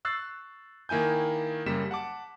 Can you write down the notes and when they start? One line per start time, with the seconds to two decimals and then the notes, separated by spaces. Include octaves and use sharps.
0.05 C#6 E6 F#6 A6 C7
0.89 D#3 A#3 E4 G#5 G6
1.66 F#2 C#3 G3 A#3 B6 E7
1.91 F#5 A5 D6